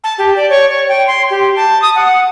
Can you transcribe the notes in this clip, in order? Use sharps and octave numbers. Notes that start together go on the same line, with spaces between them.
A5
G4
D5
C#5
C#5
G5
C6
G4
A5
D#6
F#5